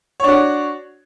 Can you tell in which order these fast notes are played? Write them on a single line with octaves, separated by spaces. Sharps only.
C#5 D4 F#4